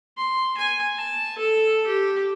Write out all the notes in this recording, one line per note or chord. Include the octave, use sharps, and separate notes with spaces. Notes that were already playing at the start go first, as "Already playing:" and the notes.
C6
G#5
A5
A4
G4